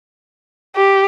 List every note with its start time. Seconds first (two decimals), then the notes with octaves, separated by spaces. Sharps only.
0.76 G4